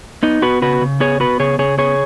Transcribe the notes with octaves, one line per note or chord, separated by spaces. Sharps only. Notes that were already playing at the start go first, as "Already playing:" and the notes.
B3 D#4
B3 F#4 B4
C#3 F#4 B4
C#3
B3 G#4 C#5
B3 F#4 B4
C#3 G#4 C#5
C#3 G#4 C#5
B3 G#4 C#5